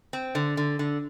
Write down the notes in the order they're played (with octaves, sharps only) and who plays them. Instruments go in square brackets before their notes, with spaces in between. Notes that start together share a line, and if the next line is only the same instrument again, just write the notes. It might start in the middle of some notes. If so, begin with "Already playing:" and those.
[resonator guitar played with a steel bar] C4
D3
D3
D3